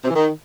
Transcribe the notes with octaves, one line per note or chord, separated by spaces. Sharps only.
C3
E3
D#3